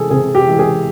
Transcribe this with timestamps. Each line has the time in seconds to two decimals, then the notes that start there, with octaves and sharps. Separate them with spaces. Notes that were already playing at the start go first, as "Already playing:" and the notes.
Already playing: C3 E3 G#3 G#4 A4
0.10 C3 G#4
0.35 G4
0.47 E3 G#3
0.59 G#4